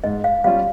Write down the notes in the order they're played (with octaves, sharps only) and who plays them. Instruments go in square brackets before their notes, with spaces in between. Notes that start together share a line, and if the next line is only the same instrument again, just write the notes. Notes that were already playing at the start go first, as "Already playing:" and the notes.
[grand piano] G#2 [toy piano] D#5
[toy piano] F5
[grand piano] G3 C#4 F4 [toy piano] F5